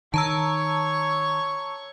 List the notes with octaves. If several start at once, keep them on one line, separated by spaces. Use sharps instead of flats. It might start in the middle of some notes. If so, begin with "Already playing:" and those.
D#3 C#5 A5 A#5 C#6 E6